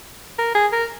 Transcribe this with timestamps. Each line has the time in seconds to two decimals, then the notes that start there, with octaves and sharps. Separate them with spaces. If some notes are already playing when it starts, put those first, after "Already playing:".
0.39 A#4
0.55 G#4
0.73 A#4